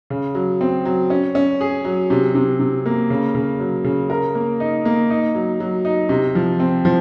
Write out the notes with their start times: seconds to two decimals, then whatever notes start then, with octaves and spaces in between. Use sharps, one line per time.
0.10 C#3
0.35 F#3
0.61 C4
0.85 F#3
1.10 C#4
1.35 C#4
1.61 G#4
1.85 F#3
2.10 C3
2.35 C3
2.59 C3
2.86 A#3
3.10 C#3
3.35 C#3
3.60 F#3
3.84 C#3
4.10 A#4
4.35 A#3
4.60 D#4
4.85 A#3
5.10 D#4
5.35 F#3
5.60 F#3
5.85 D#4
6.09 C3
6.35 F3
6.60 C4
6.85 F3